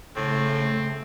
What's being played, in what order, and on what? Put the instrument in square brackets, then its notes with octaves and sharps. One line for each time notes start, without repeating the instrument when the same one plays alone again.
[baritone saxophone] A2 [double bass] C#3 [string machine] A3 [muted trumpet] C4